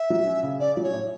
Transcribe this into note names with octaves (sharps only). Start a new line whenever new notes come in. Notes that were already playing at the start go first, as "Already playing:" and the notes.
Already playing: E5
F#3
C#4
C#3
C#4 D5
F#3 D5
C#5
A2